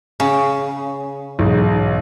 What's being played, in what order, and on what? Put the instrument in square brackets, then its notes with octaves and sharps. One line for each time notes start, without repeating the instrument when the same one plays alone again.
[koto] C#3
[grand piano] B1 E2 G#2